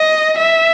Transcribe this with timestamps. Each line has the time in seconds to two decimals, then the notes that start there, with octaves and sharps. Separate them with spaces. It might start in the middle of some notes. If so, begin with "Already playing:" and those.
Already playing: D#5
0.39 E5